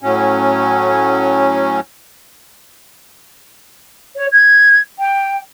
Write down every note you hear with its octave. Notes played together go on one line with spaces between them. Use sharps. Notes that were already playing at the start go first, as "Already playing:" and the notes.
A2 F#3 C#4
C#5
G#6
G5